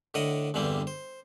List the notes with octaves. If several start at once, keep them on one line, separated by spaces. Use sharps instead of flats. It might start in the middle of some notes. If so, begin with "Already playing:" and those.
A2 D3 A#4 D#5 F#5
E2 G2 D3 G3 A#3 C4
C5